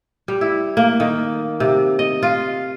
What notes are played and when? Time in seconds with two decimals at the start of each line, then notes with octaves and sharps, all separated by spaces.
0.28 G3
0.41 E4
0.77 A#3
1.00 D#3
1.60 C3
1.99 D#5
2.23 F4